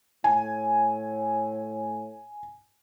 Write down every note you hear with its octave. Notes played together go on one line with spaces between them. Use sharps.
A2 G#5